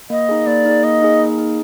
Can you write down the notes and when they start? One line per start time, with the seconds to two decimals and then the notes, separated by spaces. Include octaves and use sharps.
0.10 A#3 D#5
0.29 D#4 G#4
0.47 A#3 D5
0.65 D#4 G#4
0.83 A#3 D#5
1.02 D#4 G#4
1.20 A#3
1.38 D#4 G#4